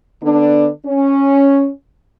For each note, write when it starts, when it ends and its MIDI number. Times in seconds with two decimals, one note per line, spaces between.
0.23 0.69 50
0.23 0.69 59
0.23 0.69 62
0.86 1.69 61